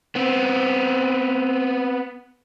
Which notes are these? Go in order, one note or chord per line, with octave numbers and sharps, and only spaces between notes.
B3 C4